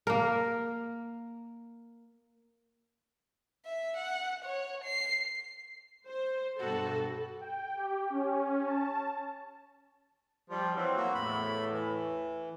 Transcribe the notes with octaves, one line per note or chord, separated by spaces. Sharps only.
A#3 A#4
E5
F#5
C#5
C7
C5
G2 B2 F#4 A4
G5
G4
C#4
A5
F3 G3 G4
E3 F#3 C4
A#3 F#4
E2 A2 B5
E3